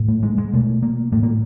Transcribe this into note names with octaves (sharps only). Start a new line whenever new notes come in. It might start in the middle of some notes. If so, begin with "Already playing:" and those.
Already playing: A2
A3
G#3
G#3
B2 A3
A#3
A2 A3
A#3